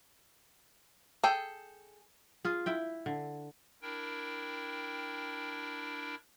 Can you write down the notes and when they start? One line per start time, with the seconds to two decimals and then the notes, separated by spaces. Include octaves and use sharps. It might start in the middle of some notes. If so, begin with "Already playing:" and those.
1.23 G#4 A4 G5
2.45 F4 G#4
2.66 E4 E5 G5
3.06 D3
3.82 D4 E4 A#4 G5